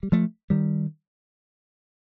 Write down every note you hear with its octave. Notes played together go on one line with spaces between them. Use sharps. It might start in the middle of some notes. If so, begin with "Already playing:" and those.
G3
F3 A3
D#3 G3